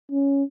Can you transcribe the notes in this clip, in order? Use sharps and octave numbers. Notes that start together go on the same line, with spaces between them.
C#4